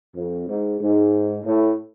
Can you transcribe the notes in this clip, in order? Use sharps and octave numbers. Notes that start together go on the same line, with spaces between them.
F2
G#2
G#2
A2